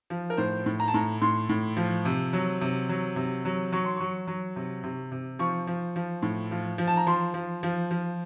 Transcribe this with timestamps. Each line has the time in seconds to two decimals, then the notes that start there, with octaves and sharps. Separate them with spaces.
0.10 F3
0.30 A#4
0.37 A2 C5
0.66 A2
0.80 A#5
0.88 A5
0.94 A2 A#5
1.22 A2 C6
1.49 A2
1.77 F3
2.05 C3
2.33 F#3
2.61 C3
2.89 F#3
3.16 C3
3.45 F#3
3.72 F#3 C#6
3.85 C6
3.96 F#3 C#6
4.27 F#3
4.56 C3
4.84 C3
5.12 C3
5.39 F3 C#6
5.67 F3
5.96 F3
6.22 A2
6.51 F3
6.78 F3
6.87 A5
6.97 A#5
7.07 F3 C6
7.34 F3
7.63 F3
7.91 F3